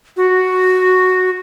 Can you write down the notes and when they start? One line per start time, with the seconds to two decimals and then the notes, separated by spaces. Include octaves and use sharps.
0.17 F#4